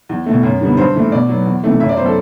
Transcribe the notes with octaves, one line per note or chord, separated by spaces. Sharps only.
E2
B2 A3
F#2
D3 G3 B3
G2 C5
E3 A3
B2 D5
F#3 B3
E2
C3 E3 A3
F#2 E5
D5
F#3 B3 C5
A4